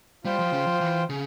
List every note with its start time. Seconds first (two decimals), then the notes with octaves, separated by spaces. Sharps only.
0.25 G3 F4 C5 G5
0.39 F3
0.53 C#3
0.67 F3
0.81 E3
1.10 C#3